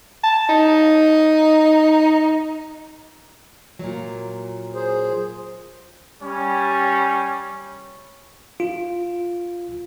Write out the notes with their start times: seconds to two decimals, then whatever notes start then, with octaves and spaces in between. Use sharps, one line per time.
0.23 A5
0.49 D#4
3.79 A#2 F#3
4.75 G#4 C5
6.21 G3 C#4
8.60 F4